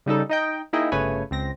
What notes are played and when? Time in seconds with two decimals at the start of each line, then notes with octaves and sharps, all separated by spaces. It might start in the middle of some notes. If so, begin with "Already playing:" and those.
0.06 C#3 G3 D#4 A4
0.29 D#4 D#5 G5
0.73 A#3 D#4 E4 G#4 D#5 G5
0.92 G1 C#3 A3 B4 C#5 G#5
1.31 C#2 C4 A#6